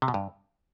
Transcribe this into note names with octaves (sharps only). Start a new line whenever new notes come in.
C3
B2
G2